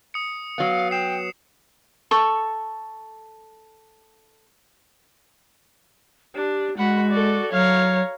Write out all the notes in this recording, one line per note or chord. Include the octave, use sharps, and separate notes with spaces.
D#6 C#7
F#3 B3 F5
G5 C7 E7
A4 C#6
D4 G4
G#3 F#4 F#5 B5
A4 D5
F#3 C#5 F5 A#5